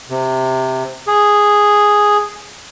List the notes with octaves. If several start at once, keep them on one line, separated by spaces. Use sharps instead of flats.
C3
G#4